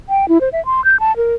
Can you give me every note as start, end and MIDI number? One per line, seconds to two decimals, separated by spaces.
0.09 0.28 79
0.28 0.41 64
0.41 0.49 72
0.53 0.63 76
0.65 0.84 84
0.85 0.99 91
1.00 1.15 81
1.17 1.35 70